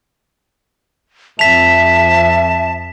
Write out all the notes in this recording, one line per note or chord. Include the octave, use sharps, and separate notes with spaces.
F2 E5 A5 B6 F7